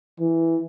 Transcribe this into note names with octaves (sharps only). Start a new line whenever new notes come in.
E3